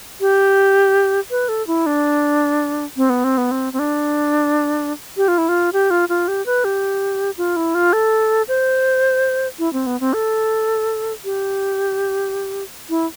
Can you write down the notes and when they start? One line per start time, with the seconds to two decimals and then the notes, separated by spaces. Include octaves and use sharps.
0.21 G4
1.31 B4
1.49 A4
1.67 E4
1.86 D4
2.97 C4
3.10 B3
3.24 C4
3.38 B3
3.51 C4
3.73 C4
3.79 D4
5.17 G4
5.28 F4
5.38 E4
5.49 F4
5.73 G4
5.91 F4
6.09 F4
6.28 G4
6.46 B4
6.65 G4
7.38 F4
7.56 E4
7.75 F4
7.93 A4
8.48 C5
9.59 E4
9.73 C4
9.86 B3
10.00 C4
10.13 A4
11.24 G4
12.90 E4